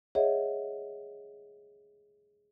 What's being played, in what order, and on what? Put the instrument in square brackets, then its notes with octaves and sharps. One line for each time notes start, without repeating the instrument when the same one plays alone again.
[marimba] G#4 C#5 D#5 E5 F#5